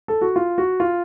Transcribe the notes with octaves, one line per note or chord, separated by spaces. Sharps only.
A4
F#4
F4
F#4
F4